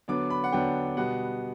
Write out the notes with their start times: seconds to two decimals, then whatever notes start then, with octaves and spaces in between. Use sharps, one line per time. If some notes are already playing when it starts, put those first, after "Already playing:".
0.08 D3 F#3 B3 D4 D6
0.30 B5
0.44 F#5
0.52 D3 F#3 B3 D4 G5
0.97 B2 G3 B3 F#5